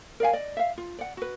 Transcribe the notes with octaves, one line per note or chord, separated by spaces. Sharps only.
A#4 D5 F5 G#5
D5 D#5
E5 F5
F4
D5 F#5
F#4 B4